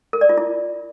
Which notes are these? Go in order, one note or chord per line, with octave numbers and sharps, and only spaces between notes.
A#4
D5
F4
E4